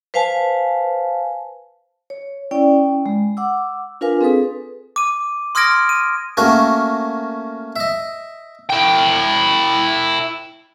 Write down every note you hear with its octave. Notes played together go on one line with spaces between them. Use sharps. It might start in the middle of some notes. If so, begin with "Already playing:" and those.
B4 C5 F5 G#5 A5
C#5
C#4 E4 D5 G5
G#3
F#5 D6 E6
D4 F4 A#4 B4 F5 G#5
C4 G#4 A4 B4 D#6
D6 D#7
C6 D#6 F6 G#6 A#6 D7
D#7
A3 A#3 C#4 F#4 A#4
D#5 E5
E4 G5